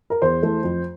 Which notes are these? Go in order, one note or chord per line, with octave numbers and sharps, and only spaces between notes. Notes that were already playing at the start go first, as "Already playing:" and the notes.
A#4
E2 C5
E3 A3
F2